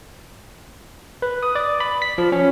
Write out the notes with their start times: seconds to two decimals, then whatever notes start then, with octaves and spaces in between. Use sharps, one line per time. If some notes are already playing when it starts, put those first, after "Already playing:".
1.22 B4
1.43 D#6
1.55 D5
1.80 B5
2.02 B6
2.18 F3
2.32 C#4